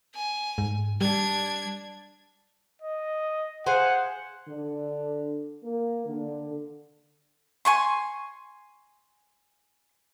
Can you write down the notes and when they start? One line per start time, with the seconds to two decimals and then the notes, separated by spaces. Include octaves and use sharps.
0.15 G#5
0.58 G#2
1.01 G3 D4 G#6
2.82 D#5
3.66 G#4 C5 F5 F#5
4.48 D3
5.64 A#3
6.06 D3
7.65 G#5 C6 C#6